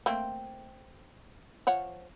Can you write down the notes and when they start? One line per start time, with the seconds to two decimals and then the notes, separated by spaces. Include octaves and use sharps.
0.06 A3 A#3 C4
1.67 F3 C#5 F#5